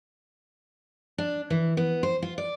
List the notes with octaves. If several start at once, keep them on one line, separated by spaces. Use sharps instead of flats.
D4
E3
B3
C5
F4
D5